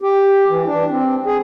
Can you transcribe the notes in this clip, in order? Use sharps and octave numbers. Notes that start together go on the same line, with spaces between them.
G4
E3
D4
C4
G#4